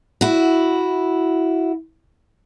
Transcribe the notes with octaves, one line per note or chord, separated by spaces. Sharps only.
E4 F#4